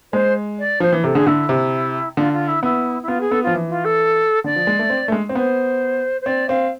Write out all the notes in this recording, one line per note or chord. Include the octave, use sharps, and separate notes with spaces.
G#3 C5
D5
F3 C5
E3
C3 A4
D3 G#4
D3 E4
C3
D3 F4
F4
E4
B3 E4
E4
B3 F4
G#4
B3 A4
F3 F4
E3
F4
A4
D3 D5
F3
G#3
A3
C4
A3
G#3
C4
B3 C5
C5
C4 D5
C4 F5